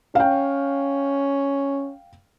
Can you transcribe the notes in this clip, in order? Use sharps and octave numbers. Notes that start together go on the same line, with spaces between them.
C#4 F5 G5